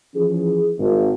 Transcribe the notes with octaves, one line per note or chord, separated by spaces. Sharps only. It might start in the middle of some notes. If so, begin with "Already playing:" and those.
E3 F3 C#4 G#4
G#1